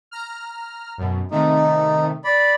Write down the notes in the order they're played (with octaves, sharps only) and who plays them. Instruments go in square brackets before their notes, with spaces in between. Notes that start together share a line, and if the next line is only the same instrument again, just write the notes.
[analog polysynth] A#5 F6
F#2 B2
[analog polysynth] C3 D#3 A3 [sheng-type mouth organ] D#4
[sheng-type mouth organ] D5 B5